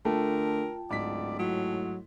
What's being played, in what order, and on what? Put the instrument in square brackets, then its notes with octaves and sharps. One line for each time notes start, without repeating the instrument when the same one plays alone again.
[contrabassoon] D3 [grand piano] A3 [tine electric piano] F4 G5 A5 [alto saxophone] A#4
[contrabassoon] D1 [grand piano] G#2 B6 [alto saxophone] D5
[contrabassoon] A2 [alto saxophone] F#3